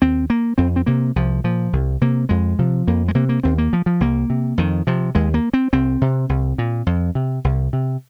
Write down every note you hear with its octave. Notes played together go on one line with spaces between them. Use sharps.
D#2 C4
A#3
F2 C4
C4
C3 A#3
C2 F3
A#2 F3
C2
C3 A#3
F2 G#3
C3 F3
F2 A#3
G#3
C3 A#3
A#3
D#2 C4
A#3
F3
F3
C2 A#3
C3
F2 D#3
C3 F3
D#2 G#3
A#3
C4
C2 C4
C3
C2
A#2
F2
C3
C2
C3